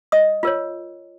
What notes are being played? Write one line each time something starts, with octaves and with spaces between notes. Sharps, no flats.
D#5 D#6
F4 A#4 C#5